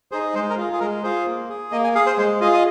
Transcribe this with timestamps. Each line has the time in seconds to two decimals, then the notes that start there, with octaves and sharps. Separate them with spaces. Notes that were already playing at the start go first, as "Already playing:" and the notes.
0.12 D#4 G#4 C5
0.34 G#3 C5
0.50 A#4
0.57 F4 G#4
0.73 G#4
0.80 G#3 A#4
1.03 F4 G#4 C5
1.26 A#3
1.50 G#4
1.72 A#3 D#5
1.84 G#5
1.95 G#4 F5
2.06 C5
2.17 G#3 C5
2.41 F4 D#5
2.44 G#4
2.54 D#5